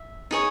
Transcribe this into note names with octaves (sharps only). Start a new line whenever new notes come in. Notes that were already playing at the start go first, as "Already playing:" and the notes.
Already playing: E5
D#4 G#4 C#5